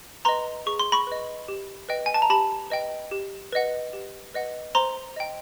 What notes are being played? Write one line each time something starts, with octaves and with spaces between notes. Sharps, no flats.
B4 D#5 A#5 C6
G#4 C#6
C6
B5 C#6
B4 D#5
G4
B4 D#5 G5
G#5
A5
A#5
G4 A5 B5
B4 D#5 G5
G4
B4 D#5 F#5
G4
B4 D#5 F#5
C5 A#5 C6
D#5 G5